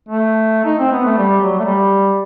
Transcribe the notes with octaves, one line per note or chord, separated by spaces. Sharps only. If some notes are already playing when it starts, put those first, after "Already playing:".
A3
D#4
C4
B3
A3
G3
F#3
A3
G3